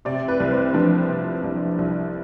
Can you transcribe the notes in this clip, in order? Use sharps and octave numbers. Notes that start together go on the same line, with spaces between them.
C3 D5
B4
C2
C4
F3 D4
C3
C2
C2